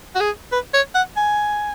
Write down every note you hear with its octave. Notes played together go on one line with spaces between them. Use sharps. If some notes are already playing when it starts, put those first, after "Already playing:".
F#4
G#4
B4
C#5
F#5
G#5